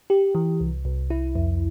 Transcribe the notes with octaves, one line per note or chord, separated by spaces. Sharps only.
G4
E3
C2
C2
E4
F2